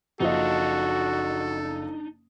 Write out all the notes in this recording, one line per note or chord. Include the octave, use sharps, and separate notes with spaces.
F#1 F3 D4 D#4 F#4 A4 D#5